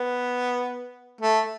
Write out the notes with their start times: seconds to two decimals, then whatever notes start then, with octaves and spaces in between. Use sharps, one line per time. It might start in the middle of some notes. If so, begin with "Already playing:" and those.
Already playing: B3
1.21 A3